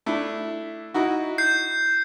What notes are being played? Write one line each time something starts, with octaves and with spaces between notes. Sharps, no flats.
A3 D4 E4
D#4 E4 F#4
G6 C7